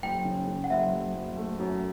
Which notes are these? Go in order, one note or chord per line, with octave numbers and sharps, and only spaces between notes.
F#1 G5
C#3
C#3
F#5
F#1 E5
F#1
F#1
A3
F#2